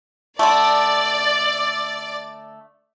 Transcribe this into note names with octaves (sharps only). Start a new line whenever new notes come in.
D3 A3 D5